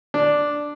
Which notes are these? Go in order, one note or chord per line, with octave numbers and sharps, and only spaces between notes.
D4